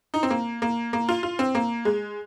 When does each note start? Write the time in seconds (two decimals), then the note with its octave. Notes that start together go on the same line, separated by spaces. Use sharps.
0.14 D#4
0.23 C4
0.30 A#3
0.62 A#3
0.93 A#3
1.09 F4
1.23 F4
1.39 C4
1.55 A#3
1.85 G#3